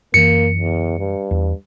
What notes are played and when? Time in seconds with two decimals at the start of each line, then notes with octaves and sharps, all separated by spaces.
0.14 F#2 E3 A#3 C#7
0.58 E2
0.99 G2
1.31 E2